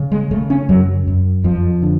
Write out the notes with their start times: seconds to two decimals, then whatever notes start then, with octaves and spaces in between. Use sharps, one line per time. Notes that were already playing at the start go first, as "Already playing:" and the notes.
Already playing: C#3
0.12 G#3
0.31 C#3 A3
0.50 C#4
0.69 F#2 F#3
1.07 F#2
1.44 F2 F3
1.82 D3